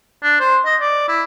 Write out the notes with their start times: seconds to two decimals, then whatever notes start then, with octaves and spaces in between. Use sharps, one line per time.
0.23 D4
0.40 C5
0.66 D#5
0.81 D5
1.09 E4